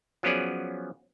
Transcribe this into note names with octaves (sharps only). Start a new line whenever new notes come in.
F3 F#3 B3 C#4 G#4 D5